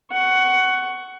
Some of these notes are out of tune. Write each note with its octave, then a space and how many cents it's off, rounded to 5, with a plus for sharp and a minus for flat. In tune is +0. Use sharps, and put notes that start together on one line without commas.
F#5 +15 C#6 +0